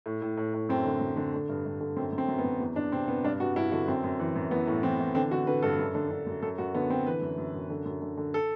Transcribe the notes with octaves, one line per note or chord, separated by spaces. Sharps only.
A2
A2
A2
A2
F#2 C4
D3
F#2
D3
D3
G2
G2
D3
F#2 C4
F#2
C4
F#2
B3
F#2
E2
E2 D4
C3 C4
C3 B3
G2 D4
G2 F#4
G2 E4
D3 F#4
F#2 C4
F#2
E3
F#2
E3 B3
A2
E3 C4
E3
D3 C4
D3 F#4
D3 B4
G2 A4
F#2
D3
D3
F#2
F#2 A4
F#2 F#4
D3 B3
D3 C4
E3 B4
F#2
F#2
F#2
D3
F#2
D3
D3
A4